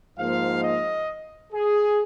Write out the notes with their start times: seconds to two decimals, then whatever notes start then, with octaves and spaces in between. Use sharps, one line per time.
0.17 G#2 F3 A#3 F5
0.63 D#5
1.53 G#4